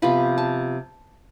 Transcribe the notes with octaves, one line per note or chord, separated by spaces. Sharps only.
C3 F3 B3 F4 B5
A5